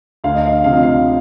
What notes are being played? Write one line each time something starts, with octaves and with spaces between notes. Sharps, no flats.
D2 F5
D#5
F5
C3 F3 F5
D#5
F5